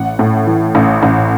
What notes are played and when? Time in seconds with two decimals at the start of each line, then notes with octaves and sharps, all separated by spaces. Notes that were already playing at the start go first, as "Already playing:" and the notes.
Already playing: A1 F#5
0.19 A2
0.47 E3
0.75 A1
1.03 A1